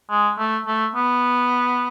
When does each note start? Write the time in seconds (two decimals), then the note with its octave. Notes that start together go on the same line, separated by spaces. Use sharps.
0.10 G#3
0.38 A3
0.66 A3
0.95 B3